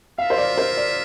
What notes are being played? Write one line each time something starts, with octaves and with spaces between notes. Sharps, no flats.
F4 A#4 E5 F5
C5
D5
C5
D5